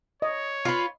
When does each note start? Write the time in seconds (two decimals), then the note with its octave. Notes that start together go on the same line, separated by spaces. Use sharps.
0.22 C#5 D#5
0.65 F4 B4